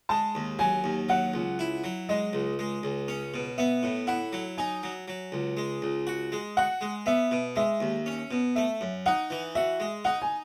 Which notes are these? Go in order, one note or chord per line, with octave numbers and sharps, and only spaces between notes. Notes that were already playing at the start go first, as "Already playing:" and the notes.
G#3 A5
D#2
F#3 G#5
D#2
F#3 F#5
C#2
E4
F#3
G#3 D#5
C#2
G#3
C#2
C#4
B2
B3 E5
A2
E4 F#5
F#3
D#4 G#5
F#3
F#3
C#2
G#3
C#2
F#4
G#3
F#4 F#5
G#3
B3 E5
B2
G#3 E5
D#2
C#4
B2
A3 E5
F#2
D#4 F#5
E3
F#4 E5
G#3
D#4 F#5
G#5